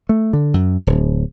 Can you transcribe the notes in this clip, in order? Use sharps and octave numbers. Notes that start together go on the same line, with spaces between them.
A3
D3
F#2
D1